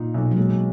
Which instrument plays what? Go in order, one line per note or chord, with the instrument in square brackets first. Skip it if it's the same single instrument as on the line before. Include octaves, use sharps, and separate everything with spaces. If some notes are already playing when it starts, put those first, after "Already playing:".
Already playing: [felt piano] A#2 D#4
B1
[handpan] F#3
[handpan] G#3 [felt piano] A#3
[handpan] B2